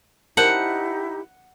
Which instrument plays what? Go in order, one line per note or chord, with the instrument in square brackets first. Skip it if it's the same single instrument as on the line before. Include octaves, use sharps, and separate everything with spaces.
[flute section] D#4 E4 G4 [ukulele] A#4 C5 A5 [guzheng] F#5